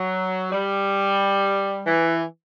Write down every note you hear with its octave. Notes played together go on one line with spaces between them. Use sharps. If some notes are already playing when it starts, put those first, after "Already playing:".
Already playing: F#3
G3
E3